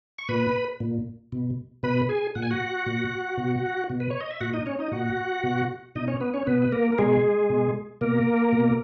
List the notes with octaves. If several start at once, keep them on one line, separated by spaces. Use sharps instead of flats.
C#6
A#2 B4 B5
A#2
B2
B2 B4 B5
G#4 G#5
A#2 F#5
G#5
F#4 F#5
A#2
B2
B2
B4
C#5
D#5
E5
A#2 F#4 F#5
D#4 D#5
C#4 C#5
D#4 D#5
A#2 F#4 F#5
B2
B2 D#4 D#5
C#4 C#5
B3 B4
C#4 C#5
B2 B3 B4
B4
A#3 A#4
A#4
B2 G#3 G#4
B2
B2 A#3 A#4
B2